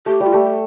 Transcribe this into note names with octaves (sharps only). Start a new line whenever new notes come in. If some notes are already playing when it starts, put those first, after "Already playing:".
A3 G4
G3
F4
A3 G4